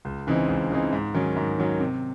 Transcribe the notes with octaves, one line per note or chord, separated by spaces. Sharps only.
C#2
C#3 E3 C4 D#4
C#2
C#3 E3 C4 D#4
G#2
D#3 F#3 C#4
G#2
D#3 F#3 C#4
C3